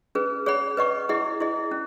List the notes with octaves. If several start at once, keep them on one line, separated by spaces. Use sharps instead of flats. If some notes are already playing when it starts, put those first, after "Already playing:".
C#4 G#4 B4
G#4 C#5 F#5 B5
B4 D#5 F#5 C#6
E4 G#4 D#5 F#5
E4 G#4 D#5
C#4